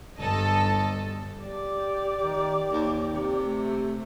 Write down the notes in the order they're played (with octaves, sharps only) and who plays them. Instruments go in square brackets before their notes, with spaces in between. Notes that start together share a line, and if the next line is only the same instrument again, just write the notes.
[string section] G1 A4 D#5 A5
[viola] G4 D5
[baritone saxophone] D#3
D#2
C3
[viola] A3